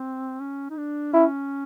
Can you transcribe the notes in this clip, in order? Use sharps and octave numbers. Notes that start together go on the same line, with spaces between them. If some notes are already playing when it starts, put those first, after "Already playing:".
Already playing: C4
C#4
D#4
D4
C#4 E4